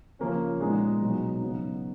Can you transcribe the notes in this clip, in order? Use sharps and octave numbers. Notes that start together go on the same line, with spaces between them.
C#3 F3 A#3 C#4
A#2 G#3 B3 D#4
B2 F#3 B3 D#4
C#3 F#3 B3 D#4